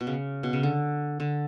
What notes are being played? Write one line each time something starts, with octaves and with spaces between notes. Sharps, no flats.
B2
C#3
B2
C#3
D3
D3